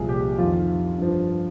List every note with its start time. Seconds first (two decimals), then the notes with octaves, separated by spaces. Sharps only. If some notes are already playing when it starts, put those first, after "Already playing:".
Already playing: C2 A#2 F3 G#4
0.09 G4
0.38 F2 D#3 F4
0.98 G2 F3